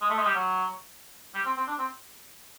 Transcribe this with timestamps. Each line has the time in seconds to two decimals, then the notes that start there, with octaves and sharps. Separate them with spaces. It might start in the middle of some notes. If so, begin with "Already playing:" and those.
0.02 G#3
0.10 A3
0.19 G#3
0.26 G3
0.35 F#3
1.35 G3
1.45 C4
1.57 C4
1.68 D4
1.79 C4